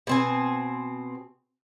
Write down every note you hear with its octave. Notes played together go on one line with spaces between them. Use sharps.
B2 C4 G#5